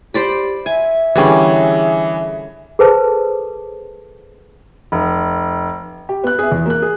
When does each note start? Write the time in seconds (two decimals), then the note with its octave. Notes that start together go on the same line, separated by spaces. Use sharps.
0.14 G4 C5 D5 B5
0.66 E5 G#5
1.16 D3 E3 G3 C#4 G#4
2.79 G#4 A4 B4 C5 A5
4.92 F1
6.09 G4
6.24 B3 F#6
6.39 G#4 E5
6.52 E2
6.66 A#3 F#6
6.82 G#4